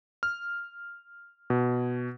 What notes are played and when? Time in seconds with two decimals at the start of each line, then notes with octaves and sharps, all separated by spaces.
0.23 F6
1.50 B2